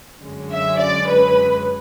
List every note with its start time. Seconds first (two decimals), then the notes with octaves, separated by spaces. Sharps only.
0.21 F#2 D3 G#3 C#4
0.50 E5
0.78 D5
1.07 B4